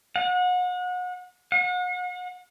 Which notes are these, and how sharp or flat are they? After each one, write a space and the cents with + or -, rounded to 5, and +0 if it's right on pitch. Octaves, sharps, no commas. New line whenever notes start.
F#5 -35
F#5 -40